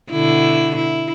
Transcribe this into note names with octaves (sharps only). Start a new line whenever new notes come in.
B2 D3 E4
E4